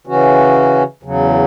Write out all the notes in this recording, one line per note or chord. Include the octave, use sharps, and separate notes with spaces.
C#3 E3 C#4 F#4
E2 C#3 F#3